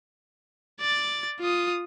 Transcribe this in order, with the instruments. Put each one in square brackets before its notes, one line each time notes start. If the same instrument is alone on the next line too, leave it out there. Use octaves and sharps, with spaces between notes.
[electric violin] D5 A6
F4 D#6